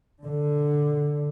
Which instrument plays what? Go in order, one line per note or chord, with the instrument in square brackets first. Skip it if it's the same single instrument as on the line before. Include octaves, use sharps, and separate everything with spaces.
[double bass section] D3